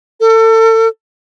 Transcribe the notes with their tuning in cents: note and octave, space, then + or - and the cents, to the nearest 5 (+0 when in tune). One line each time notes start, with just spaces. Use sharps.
A4 +35